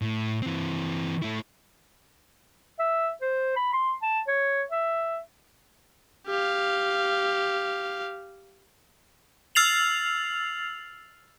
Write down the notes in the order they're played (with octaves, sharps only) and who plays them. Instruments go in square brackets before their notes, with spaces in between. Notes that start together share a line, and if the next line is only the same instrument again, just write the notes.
[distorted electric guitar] A2
E3 C4
A3 E4
[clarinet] E5
C5
B5
C6
A5
C#5
E5
[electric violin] G4 F5
[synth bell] E6 F6 A6 C7 F7 F#7